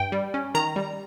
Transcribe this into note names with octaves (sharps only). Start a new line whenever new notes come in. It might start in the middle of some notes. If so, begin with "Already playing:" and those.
Already playing: G2 G5
G3
C#4
D#3 A#5
G3